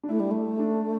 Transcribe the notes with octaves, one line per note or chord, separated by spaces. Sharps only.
D4
A3 E4
G3
A3
D4